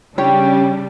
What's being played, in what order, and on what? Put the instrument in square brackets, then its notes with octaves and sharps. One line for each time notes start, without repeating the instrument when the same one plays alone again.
[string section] C#3 G3 D4 [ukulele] G4 C#5